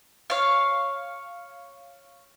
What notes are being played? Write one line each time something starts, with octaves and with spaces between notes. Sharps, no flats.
C#5 F5